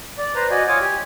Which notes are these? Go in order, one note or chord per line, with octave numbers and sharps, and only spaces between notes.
D5
B4 C5 A#5
F#4 D5 D#5 G#5
F4 C#5 G#5 D6 D#6
G4 G#5